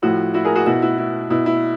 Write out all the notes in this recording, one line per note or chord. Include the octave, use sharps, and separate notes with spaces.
A2 F3 E4 F#4
E4 F#4
G#4 A#4
F#4 G#4
B2 E4 F#4
E4 F#4
E4
B2 E4
E4